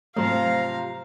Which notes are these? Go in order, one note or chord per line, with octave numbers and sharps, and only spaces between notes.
G#2 C3 F3 F#3 A3 F5 A#5